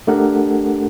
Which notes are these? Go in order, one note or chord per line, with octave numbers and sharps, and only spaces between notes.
A3 D4 G4 A4 A#4 F#5